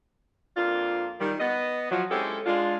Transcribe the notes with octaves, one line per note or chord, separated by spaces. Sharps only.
F2 A#3 D4 F4
D#3 G3
B3 D#5
F3 F#3
G#3 C4 C#4 E4 G4 A4
G#3 D4 F4